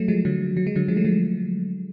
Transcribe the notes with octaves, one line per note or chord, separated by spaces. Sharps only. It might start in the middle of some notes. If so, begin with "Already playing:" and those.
Already playing: F#3 A3
F3 G#3
D3 F#3
F#3
G#3
D3 F#3
F3 G#3
F#3 A3
F3 G#3